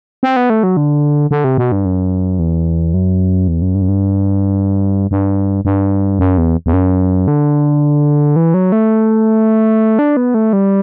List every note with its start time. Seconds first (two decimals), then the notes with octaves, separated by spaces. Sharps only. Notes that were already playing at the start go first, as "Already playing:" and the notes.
0.23 C4
0.36 B3
0.50 A3
0.63 F#3
0.77 D3
1.31 D3
1.44 C3
1.58 B2
1.72 G2
1.85 F#2
2.39 E2
2.94 F#2
3.48 E2
3.62 F#2
3.75 G2
3.82 F#2
3.88 G2
5.11 G2
5.65 G2
6.19 F#2
6.38 E2
6.66 E2
6.73 F#2
7.28 D3
8.36 E3
8.54 F#3
8.72 A3
9.99 D4
10.17 B3
10.34 A3
10.53 G3